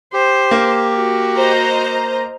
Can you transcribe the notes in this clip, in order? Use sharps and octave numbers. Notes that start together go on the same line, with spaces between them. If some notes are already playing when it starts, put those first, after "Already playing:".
G4 C5
A#3
F#4
C5 D#5 A#5